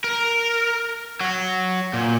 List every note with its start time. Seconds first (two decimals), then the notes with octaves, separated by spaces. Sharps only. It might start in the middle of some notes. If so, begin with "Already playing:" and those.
0.04 A#4
1.21 F#3
1.93 A#2